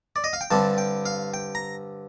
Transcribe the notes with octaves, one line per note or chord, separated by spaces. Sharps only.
D5
D#5
F5
G5
G2 D3 G3 C4 A5
G5
F5
G5
A#5